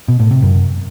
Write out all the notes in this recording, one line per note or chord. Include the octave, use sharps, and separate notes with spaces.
B2
A2
C3
F#2